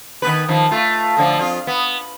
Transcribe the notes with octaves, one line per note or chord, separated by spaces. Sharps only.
D#3 B3 B4
D#3 F3
A3 F4
A2 D3 F3
F2 F4
B3